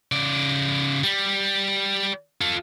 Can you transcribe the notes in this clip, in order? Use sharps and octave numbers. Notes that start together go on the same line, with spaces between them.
C#3 D5
G3
F4 A4